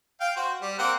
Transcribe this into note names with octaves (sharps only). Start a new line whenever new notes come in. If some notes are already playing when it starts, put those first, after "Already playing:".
F5 G5
F#4 C5
G3
A#3 C4 F#5